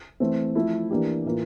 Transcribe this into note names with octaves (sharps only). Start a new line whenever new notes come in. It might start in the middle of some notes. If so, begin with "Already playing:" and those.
E3 A3 C4
F3 A3 E4
E3 A#3 D4 G4
A2 E3 A#3 F4